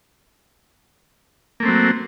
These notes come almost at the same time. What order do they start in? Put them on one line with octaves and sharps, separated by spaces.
A#3 A3 C4 F#3